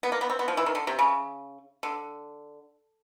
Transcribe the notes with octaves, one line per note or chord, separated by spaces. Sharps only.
B3
A#3
B3
C4
B3
F3
E3
D#3
D3
C3
C#3
D3